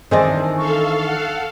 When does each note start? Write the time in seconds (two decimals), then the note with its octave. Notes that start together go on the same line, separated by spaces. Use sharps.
0.11 D#3 E3 C4 D4 G#4 C5 D#5
0.57 A4 F5 C#6
1.06 F#5